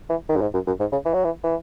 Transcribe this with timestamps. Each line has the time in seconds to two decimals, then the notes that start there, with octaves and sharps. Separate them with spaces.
0.10 E3
0.29 D#3
0.37 F#2
0.42 G#2
0.54 F#2
0.67 F#2
0.80 G#2
0.92 C#3
1.06 E3
1.14 F#3
1.24 E3
1.44 E3